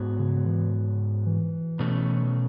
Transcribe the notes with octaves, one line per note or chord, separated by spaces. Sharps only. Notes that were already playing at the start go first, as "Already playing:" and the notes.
Already playing: G#2 B3 F#4 C#5
C#3
E3
E3
B2 A3 C#4